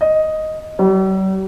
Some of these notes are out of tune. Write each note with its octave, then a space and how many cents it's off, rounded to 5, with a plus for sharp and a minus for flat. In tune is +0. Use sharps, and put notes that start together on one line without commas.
D#5 +5
G3 -45